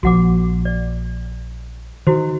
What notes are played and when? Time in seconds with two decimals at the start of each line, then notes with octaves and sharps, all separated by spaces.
0.03 A#1 F3 F#4 F#5 D6
0.65 D5
2.07 D#3 E4 F#4 C5